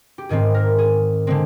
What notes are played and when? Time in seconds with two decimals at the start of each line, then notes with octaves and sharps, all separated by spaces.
0.18 G4
0.29 G#2 D#3 G#3 C4 G#4
0.54 A#4
0.78 G#4
1.27 D3 G#3 C4